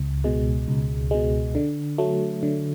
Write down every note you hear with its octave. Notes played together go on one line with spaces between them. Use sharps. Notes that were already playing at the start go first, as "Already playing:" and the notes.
Already playing: C#2
B2 G#3
C#2
B2 G#3
D3
F#3 A3
D3